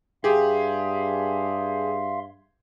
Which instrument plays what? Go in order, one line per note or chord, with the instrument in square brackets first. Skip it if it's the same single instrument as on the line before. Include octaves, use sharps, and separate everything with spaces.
[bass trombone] G2 [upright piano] G4 G#4 [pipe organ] E5 F5 C6